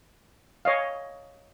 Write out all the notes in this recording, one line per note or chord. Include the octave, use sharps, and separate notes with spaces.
C#5 D#5 F5